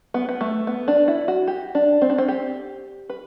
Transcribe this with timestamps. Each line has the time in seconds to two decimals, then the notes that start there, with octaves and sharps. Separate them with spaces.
0.14 B3
0.29 B3
0.41 A3
0.67 B3
0.88 D4
1.08 E4
1.28 F#4
1.47 G4
1.75 D4
2.01 C4
2.10 D4
2.18 C4
2.28 G4
3.09 B4